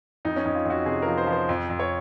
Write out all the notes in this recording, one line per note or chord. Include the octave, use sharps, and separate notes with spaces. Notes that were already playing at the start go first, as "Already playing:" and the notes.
F2 D#4
C#4
F2 D#4
F4
F2
F#4
C3 G#4
F3 A#4
C5
F3
C5
F2
F2
C#5